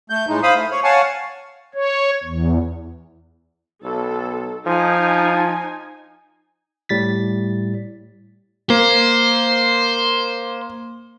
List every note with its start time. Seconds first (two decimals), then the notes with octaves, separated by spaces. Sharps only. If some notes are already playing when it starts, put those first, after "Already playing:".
0.10 A3 G6
0.29 A2 G#3 D#4
0.43 C5 F5 B5 D#6
0.55 A3
0.71 C#5
0.84 C#5 F5 F#5 G#5 A5
1.74 C#5
2.23 E2
3.83 B1 A4
4.66 F3 D#4 G#5
6.89 A2 G3 A6 B6
8.70 A#3 C5